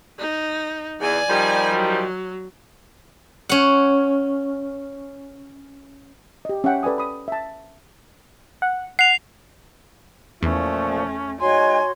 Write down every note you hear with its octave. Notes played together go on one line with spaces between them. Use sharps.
D#4
E2 D5 G#5
D#3 F3 G3
F#3
C#4 F#5
G4 D#5
C#4 E5 F#5 G5
A4 B4 D5 G#5 D#6
B5 D#6
E5 A5
F#5
F#5 C7 F7
E2 A#2 F3 A3 C#4
G#3 D#4 F#4 C#5 G#5 C6